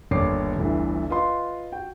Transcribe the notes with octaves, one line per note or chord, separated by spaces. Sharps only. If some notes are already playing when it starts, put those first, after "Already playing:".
G1 D#2 C#5 D5 D6 C7
G1 D2 G2 E3
F4 B4 D#5 C6
F#4 G5